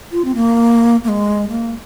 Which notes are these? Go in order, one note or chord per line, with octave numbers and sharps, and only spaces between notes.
F4
C4
A#3
A#3
G#3
A#3